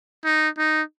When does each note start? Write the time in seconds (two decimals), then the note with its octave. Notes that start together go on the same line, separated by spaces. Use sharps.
0.25 D#4
0.58 D#4